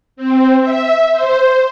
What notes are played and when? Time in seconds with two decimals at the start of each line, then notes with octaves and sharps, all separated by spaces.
0.16 C4
0.61 E5
1.11 C5